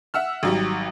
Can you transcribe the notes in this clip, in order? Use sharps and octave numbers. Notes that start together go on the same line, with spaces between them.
E5 F#5 E6 F6
G#1 F#3 G3